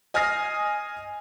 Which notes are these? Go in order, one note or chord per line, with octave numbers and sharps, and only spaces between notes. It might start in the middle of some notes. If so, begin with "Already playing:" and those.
D#5 G#5 D#6 F6 A#6 C7